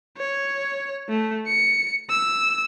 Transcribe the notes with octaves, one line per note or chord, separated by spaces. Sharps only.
C#5
A3
C#7
E6